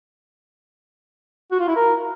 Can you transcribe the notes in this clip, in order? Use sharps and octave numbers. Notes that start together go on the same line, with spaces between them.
F#4
F4
E4
A#4